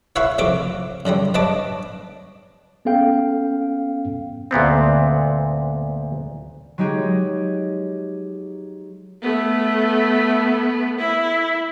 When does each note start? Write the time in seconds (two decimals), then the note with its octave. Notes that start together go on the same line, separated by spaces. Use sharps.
0.16 E4 B4 C#5 F5 F#5 C#6
0.38 F2 C3 F#3 A#3 C#6 D6
1.05 F#2 D3 F#3 G3
1.34 G2 B4 C#5 D#5 A5 D6
2.85 B3 C#4 A4 F5 G5
4.51 D2 A#2 B3 C4
6.78 F#3 G#3 D#4 G4 G#4
9.22 A3 B3
10.98 E4